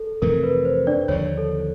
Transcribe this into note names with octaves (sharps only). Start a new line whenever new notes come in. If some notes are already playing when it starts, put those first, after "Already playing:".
Already playing: A4
F2 C3 E3 A3 A#4
B4
C5
D4 D5
D#2 D3 F3 C#5
A4